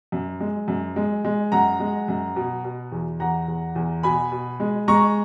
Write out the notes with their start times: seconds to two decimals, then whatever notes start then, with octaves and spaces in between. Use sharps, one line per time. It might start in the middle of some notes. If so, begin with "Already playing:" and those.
0.12 F#2
0.40 G#3
0.68 F#2
0.96 G#3
1.24 G#3
1.52 F#2 F#5 A#5
1.80 G#3
2.08 F#2
2.36 B2
2.64 B2
2.92 E2
3.20 E2 F#5 A#5
3.48 E2
3.76 E2
4.03 B2 G#5 B5
4.32 B2
4.60 G#3
4.88 G#3 A#5 C#6